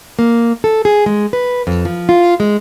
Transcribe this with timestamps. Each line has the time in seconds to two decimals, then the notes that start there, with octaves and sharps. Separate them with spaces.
0.19 A#3
0.64 A4
0.85 G#4
1.06 G#3
1.33 B4
1.67 F2
1.85 F3
2.09 F4
2.40 G#3